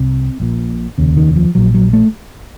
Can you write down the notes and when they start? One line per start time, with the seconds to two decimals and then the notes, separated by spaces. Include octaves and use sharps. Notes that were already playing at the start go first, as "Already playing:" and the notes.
Already playing: C2 C3 C4
0.40 A#1 A#2
0.98 F1 D#2 C#3
1.17 D#3
1.36 F3
1.55 A#1 A#2 F#3
1.74 F#3
1.93 A3